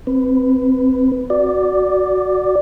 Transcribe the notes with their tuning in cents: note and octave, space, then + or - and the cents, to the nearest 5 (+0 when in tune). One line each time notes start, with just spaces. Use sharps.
C4 +0 B4 +10
F#4 +0 D5 +0